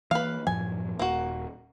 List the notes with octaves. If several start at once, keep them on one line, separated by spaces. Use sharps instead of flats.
E3 A#3 B4 F5
F#2 A2 F3 G#5
D#1 A#3 F#4